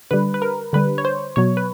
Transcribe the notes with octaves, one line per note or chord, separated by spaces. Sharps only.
D3 G3 B4
B4
A#4
D3 G3 B4
C#5
C5
B2 F#3 C#5
B4